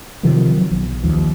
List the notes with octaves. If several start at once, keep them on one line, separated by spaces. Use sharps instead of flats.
C3 D#3 F3 F#3
F#3
B1
D#2 F3